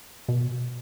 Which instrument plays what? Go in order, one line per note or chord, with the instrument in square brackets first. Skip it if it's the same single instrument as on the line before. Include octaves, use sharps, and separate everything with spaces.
[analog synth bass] B2